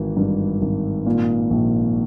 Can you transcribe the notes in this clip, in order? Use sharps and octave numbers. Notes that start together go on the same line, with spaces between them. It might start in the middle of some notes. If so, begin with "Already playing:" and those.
Already playing: G#1 E3
G2
G#1
A#2
A#1